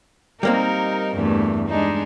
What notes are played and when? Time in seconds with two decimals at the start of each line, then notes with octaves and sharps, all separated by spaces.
0.43 G3 A#3 C4 D#4 A#4
1.15 E2 G2 A3
1.69 G#3 D4 D#4